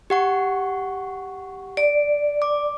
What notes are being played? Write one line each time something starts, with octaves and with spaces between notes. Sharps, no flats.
G4 F#5 C#6
D5
D6